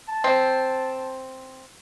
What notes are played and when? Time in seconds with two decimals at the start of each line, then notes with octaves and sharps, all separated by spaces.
0.08 A5
0.24 C4